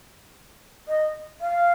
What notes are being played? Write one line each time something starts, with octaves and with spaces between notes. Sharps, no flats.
D#5
F5